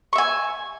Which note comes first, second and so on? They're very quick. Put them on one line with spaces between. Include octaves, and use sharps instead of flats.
C#6 E5 G#5